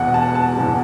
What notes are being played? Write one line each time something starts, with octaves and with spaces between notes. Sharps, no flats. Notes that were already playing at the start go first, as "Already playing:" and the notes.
Already playing: E1 E2 B2 F#5
A5
A5
E1 E2 B2